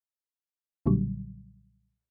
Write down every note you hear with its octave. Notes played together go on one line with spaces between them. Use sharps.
B1 A#2 D3 F#3 G3